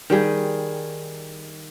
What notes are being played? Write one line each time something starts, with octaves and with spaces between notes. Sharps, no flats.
D#3 G3 G#4